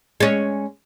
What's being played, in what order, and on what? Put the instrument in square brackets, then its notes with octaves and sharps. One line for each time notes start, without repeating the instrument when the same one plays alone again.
[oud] G#3 C#4